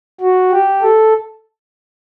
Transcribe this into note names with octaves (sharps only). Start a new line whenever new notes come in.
F#4
G4
A4